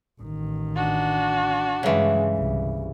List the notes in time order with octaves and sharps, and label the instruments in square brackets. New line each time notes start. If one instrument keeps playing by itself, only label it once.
[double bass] A1 D#3
[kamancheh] D4 F#4
[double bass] G2 G#3 [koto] C#3 E3
[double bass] G1 C2